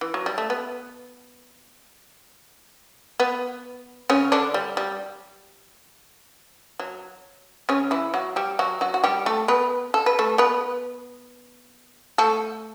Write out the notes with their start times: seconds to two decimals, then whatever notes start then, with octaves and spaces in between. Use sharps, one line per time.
0.01 E3
0.14 F#3
0.26 G3
0.38 A3
0.50 B3
3.20 B3
4.10 C#3 C#4
4.32 D3 D4
4.54 G3
4.77 G3
6.80 F#3
7.69 C#3 C#4
7.91 E3 E4
8.14 F#3 F#4
8.36 G3 G4
8.59 F#3 F#4
8.81 F#3 F#4
8.94 F#4
9.04 G3 G4
9.26 A3 A4
9.48 B3 B4
9.94 A4
10.06 B4
10.19 A3 A4
10.38 B3 B4
12.18 A3 A4